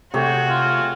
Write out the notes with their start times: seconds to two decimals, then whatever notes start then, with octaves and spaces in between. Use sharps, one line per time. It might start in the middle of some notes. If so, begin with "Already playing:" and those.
0.14 C3 A3 F#4 G#4 C#5 G5
0.49 F4